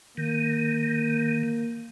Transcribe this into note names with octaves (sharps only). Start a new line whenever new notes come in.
D#3 A#3